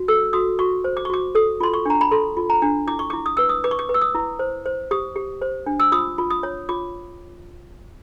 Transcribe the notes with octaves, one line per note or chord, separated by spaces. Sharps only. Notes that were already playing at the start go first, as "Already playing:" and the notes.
Already playing: F#4
A4 E6
F#4 D#6
F#4 C#6
C5
D6
C#6
F#4 D6
A4 D#6
F4 C6
C#6
D4 A#5
B5
A4 C6
F4
A#5
D4
E4 D6
C#6
E4 D6
D#6
B4 E6
D#6
B4 D6
C#6
D6
B4
E6
D#6
E4
C5
C5
G4 D#6
G4
C5
D4
E6
F4 D#6
F4
D#6
C#5
F4 D6